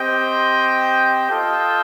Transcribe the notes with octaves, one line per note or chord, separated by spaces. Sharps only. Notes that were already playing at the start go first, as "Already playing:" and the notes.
Already playing: C4 G4 C5 D#5 G5
F4 A4 D#5 G5